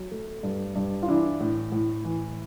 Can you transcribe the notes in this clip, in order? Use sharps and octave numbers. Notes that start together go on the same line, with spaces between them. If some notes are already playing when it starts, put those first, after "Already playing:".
Already playing: F#3
A3
G2
G2
F4
E3 D4 E4
A2
A2
E3